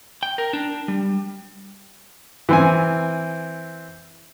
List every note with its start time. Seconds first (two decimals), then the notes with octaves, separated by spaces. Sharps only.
0.23 G5
0.38 A#4
0.53 D4
0.88 G3
2.49 E3 C4 G#5